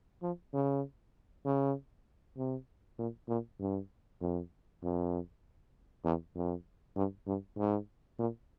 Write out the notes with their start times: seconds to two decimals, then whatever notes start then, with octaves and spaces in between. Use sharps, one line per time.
0.23 F3
0.54 C#3
1.45 C#3
2.37 C3
2.99 A#2
3.28 A#2
3.60 G2
4.21 F2
4.83 F2
6.05 E2
6.35 F2
6.96 G2
7.27 G2
7.58 G#2
8.19 A#2